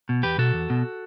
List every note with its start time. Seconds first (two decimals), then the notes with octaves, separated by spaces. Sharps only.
0.09 B2
0.23 E2 G4 B4
0.38 B2 F#4 A4
0.54 E2
0.70 B2